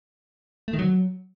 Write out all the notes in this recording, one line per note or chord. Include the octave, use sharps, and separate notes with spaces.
A3
D#3
F#3